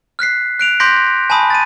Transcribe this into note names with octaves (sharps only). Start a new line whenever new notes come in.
F6 F#6 B6 C7
F#6 D7 F7
C6 D6 G6 A#6 B6 D7
G#5 A5 B5 D#6
A6 D#7